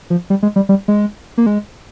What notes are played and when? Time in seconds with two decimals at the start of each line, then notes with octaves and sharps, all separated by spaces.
0.10 F3
0.30 G3
0.43 G#3
0.56 G3
0.69 G3
0.88 G#3
1.38 A#3
1.46 G#3